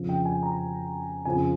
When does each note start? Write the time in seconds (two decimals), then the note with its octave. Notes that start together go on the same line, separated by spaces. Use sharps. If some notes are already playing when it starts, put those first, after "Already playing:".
Already playing: F2 C#3 F3
0.09 G5
0.25 G#5
0.43 A#5
1.25 F2 C#3 F3 G#5